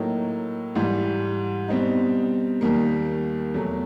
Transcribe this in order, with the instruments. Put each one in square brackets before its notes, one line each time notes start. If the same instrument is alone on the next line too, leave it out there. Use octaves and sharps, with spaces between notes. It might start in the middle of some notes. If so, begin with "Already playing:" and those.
Already playing: [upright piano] A2 F#3 A#3 D#4
G#2 E3 G3
B2 G3 C4 D#4
D#2 D#3 G3 A#3
E2 B2 F#3 A3